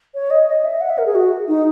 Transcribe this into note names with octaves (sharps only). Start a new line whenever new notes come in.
C#5
D#5
D#5
E5
F#5
E5
A#4
G#4
F#4
D#4